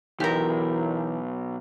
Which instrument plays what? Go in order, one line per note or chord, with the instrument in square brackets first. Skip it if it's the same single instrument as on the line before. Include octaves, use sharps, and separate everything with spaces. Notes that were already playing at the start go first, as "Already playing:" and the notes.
[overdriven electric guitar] B1 [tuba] E3 [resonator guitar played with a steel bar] G4 A#4